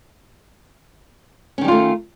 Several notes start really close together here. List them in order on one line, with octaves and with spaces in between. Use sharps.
C#4 D#3 G3 F4 A3